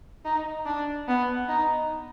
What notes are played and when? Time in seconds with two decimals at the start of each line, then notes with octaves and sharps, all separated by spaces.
0.25 D#4
0.66 D4
1.08 B3
1.48 D#4